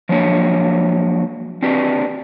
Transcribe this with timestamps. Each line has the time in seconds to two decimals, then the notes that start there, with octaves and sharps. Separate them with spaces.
0.09 F3 F#3 G#3 A#3 D4 C#5
1.62 C4 D4 F#4 G4 B4